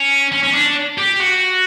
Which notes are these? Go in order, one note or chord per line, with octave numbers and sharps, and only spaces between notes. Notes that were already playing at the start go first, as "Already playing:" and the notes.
Already playing: C#4
C#4
C#4
D4
G4
F#4